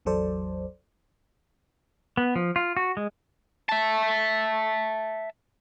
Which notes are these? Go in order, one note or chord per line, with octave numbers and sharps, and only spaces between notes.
A1 E2 F#3 A4 C5 D5
B3
F3
F4
F#4
G#3
E5 A5